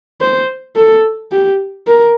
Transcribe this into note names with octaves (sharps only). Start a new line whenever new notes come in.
C5
A4
G4
A#4